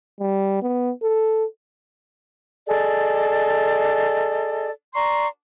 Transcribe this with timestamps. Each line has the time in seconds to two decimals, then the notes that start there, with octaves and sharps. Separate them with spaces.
0.21 G3
0.62 B3
1.02 A4
2.66 G#4 A4 D5 D#5
4.95 D5 A#5 C6 C#6